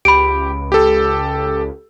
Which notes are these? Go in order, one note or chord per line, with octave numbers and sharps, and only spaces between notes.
C#2 G4 B5 D7
G4 A4